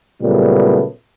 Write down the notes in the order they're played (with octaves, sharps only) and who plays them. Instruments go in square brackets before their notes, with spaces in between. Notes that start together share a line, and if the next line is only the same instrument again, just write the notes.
[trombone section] A#2 C#3 F#3 G3 A3 B3